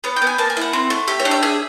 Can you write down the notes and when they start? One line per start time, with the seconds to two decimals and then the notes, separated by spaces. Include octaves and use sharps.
0.04 B3 C#5
0.16 G5
0.22 B3 G#5
0.38 A#3 A5
0.50 G#5
0.57 E4 F#5
0.73 C4
0.90 A3
1.08 G4 E5
1.20 C#5
1.25 D4
1.31 E5
1.43 G#4 E5